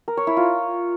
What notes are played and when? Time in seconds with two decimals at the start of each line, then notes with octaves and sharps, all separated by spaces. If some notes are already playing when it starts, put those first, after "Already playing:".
0.08 A#4
0.17 C#5
0.27 E4
0.37 F4